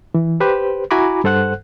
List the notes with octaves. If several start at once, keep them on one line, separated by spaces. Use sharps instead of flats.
E3
G4 B4 C5
E4 F#4 G#5 A#5 B5 D6
G2 A4 C5 F#5 F#6